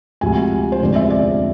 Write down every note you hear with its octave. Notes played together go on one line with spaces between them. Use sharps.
D2 C3 F3 G#3 G#5
C5
F1 E2 D3 F3 G#3 D5
E5
D5